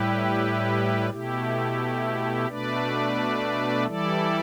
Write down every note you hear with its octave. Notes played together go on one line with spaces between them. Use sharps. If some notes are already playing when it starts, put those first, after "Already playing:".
Already playing: A2 G3 E4 G4 B4
B2 A3 E4 G4
B2 A3 D4 B4 D5
E3 G3 E4 A4 D5